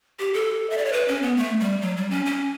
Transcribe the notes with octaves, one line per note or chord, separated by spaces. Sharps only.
G4
A4
E5
D5
C#5
B4
C#4
B3
A3
G3
F#3
G3
C#4
C#4